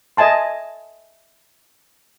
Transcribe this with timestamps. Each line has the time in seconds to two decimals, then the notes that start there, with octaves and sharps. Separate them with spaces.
0.17 A4 D#5 E5 G#5 A5 C6